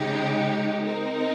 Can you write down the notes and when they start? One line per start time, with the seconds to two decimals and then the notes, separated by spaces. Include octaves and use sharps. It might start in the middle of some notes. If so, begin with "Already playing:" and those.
Already playing: C#3 G#3 D#4 G4
0.85 C4 D#4 A#4